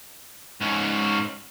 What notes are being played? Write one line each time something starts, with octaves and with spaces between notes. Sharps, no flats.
G#2 C#4